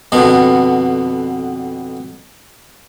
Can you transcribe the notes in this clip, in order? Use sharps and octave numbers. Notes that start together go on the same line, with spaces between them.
F2 B2 D3 B3